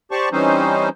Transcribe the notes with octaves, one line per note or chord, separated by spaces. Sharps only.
G4 C5 D5 A5 C#6
E3 G3 C4 C#4 D#4 C5